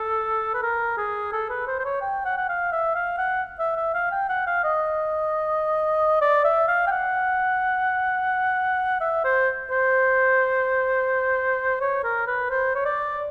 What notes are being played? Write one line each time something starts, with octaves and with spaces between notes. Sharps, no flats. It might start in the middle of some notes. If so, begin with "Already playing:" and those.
Already playing: A4
B4
A#4
G#4
A4
B4
C5
C5
C#5
G5
F#5
F#5
F5
E5
F5
F#5
E5
E5
F5
G5
F#5
F5
D#5
D5
E5
F5
G5
F#5
E5
C5
C5
C#5
A#4
B4
C5
C#5
D5